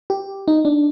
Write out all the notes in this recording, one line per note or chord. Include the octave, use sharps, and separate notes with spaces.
G4
D#4
D4